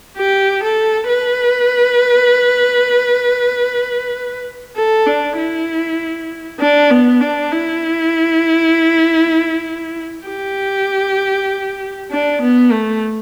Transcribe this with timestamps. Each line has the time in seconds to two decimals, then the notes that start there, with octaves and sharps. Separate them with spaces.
0.17 G4
0.63 A4
1.09 B4
4.76 A4
5.07 D4
5.37 E4
6.60 D4
6.90 B3
7.21 D4
7.52 E4
10.27 G4
12.11 D4
12.42 B3
12.72 A3